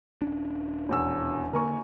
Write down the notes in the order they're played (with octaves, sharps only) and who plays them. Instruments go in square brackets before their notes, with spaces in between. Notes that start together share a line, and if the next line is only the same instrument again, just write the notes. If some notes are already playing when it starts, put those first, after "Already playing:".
[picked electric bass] D#1 C#4 D4
[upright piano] E1 E2 E6
[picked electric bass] D3 A#3 [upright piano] A#4 G#5 C#6